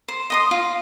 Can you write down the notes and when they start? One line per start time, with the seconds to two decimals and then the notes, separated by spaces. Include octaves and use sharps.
0.08 C5
0.30 D#5 C6 D#6
0.51 F4